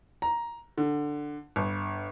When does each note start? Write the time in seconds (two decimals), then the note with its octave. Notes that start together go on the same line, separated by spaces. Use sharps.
0.22 A#5
0.78 D3
1.56 G1